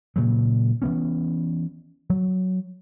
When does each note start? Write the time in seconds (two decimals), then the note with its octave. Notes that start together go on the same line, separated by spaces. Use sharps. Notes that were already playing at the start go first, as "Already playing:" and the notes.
0.16 A#2 C#3 F#3
0.82 E3 F3 B3 C#4
2.10 F#3